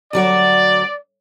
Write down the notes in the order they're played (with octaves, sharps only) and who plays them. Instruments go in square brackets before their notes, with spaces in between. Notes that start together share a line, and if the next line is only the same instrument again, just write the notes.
[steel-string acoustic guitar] D2 F#3 F#4 [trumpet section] D5